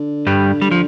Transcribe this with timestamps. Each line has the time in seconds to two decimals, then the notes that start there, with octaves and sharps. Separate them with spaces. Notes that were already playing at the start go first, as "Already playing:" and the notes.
Already playing: D3
0.27 G2 G3
0.62 G3
0.71 F3